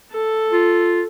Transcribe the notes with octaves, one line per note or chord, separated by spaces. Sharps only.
A4
F4